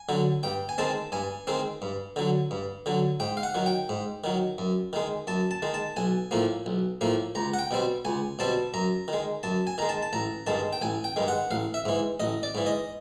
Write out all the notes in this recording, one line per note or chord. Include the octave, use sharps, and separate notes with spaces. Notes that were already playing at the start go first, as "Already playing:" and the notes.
Already playing: G#5
D3 F#3
G2 G5
G#5
D#3 G#3 C4 A5
G2 G#5
D#3 G#3 C4
G2
D3 F#3
G2
D3 F#3
G#2 G5
F5
F#5
D#3 F#3
G5
G#2
D#3 F#3
F#2
D#3 G#3
F#2 A5
A5
D#3 G#3
A5
B1 G#5
A2 F3 A#3
B1
A2 F3 A#3
C#2 A#5
F#5
G5
B2 G3 C4
C#2 G#5
B2 G3 C4 A5
F#2 A#5
D#3 G#3
F#2 A5
G#5
D#3 G#3 A#5
A5
A5
A1 A#5
G2 D#3 G#3 A5
G5
A1 G#5
G5
G2 D#3 G#3
F#5
A1 F5
E5
G#2 E3
A1 D#5
D5
G#2 E3
D#5